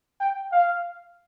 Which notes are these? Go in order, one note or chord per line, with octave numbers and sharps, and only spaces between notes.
G5
F5